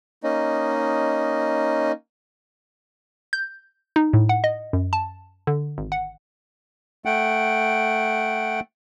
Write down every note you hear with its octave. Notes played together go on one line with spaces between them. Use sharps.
A#3 C#4 D#4 D#5
G6
D#4
A2
F#5
D#5
F#2
A5
D3
G#1
F#5
A3 F#5 G5